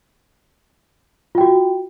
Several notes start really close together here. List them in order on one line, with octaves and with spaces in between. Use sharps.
F4 G5 F#4